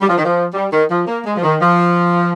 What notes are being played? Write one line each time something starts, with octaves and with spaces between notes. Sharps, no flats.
G3
F3
D#3
F3
G3
D#3
F3
A#3
G#3
F3
D#3
F3